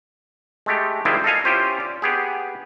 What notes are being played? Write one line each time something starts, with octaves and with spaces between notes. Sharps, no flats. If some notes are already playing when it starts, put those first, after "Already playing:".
G#3 A3 G4
D#3 G3 G#3 C4 E4 F4
A4 D#5 F5 G#5
C#4 E4 F4 G4 C5
D5
B3 G4 G#4